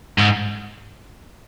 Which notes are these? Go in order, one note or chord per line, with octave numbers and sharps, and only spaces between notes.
G#2